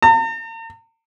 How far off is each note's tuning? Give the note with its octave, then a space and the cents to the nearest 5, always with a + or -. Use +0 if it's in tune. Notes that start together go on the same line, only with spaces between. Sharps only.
A#5 -45